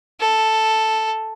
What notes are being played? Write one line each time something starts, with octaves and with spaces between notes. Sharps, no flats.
A4